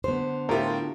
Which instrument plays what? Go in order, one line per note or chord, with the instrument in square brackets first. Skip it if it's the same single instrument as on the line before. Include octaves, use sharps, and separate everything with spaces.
[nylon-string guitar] D3 B3 [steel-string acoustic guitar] C5
[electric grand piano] A2 F4 [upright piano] E4 G4 A#4